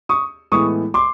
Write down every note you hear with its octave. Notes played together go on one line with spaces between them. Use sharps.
C#6 D#6
A2 E3 G#3 B3 C#6 D#6
C6 D6